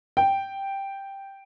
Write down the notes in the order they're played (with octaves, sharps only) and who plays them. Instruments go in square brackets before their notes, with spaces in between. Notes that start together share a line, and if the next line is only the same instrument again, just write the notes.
[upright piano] G5